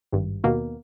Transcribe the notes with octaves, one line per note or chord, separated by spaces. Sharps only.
G#1 G2
D#2 B2 A#3